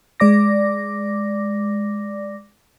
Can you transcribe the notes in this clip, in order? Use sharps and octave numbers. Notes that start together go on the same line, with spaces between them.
G#3 D5 D6 A#6